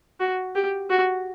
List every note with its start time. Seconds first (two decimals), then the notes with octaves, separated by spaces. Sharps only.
0.20 F#4
0.55 G4
0.90 F#4